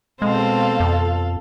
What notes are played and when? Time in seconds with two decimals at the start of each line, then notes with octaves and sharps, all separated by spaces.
0.22 B2 G#3 C4 A4 C5 F5 A5
0.80 F2